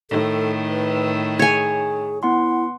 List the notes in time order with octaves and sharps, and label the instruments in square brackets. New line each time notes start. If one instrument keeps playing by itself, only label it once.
[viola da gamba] A2 D#3 [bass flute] A4
[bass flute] B4
[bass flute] G#4 [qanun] C#5 G#5
[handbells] B3 F#5 C6 [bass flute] E4